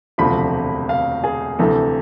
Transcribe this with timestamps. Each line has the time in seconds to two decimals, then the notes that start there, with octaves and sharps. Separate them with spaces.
0.18 E1 D2 C3 F3 B5
0.89 F5
1.24 G#4
1.59 D2 C3 E3 A4